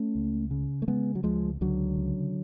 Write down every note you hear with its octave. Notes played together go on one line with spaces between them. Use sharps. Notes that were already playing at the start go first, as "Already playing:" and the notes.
Already playing: A3 C#4
C#2
C#3
A3
C#3 G#3 B3
F#3
C#2 F3 G#3
C#2 D3 F#3
C#3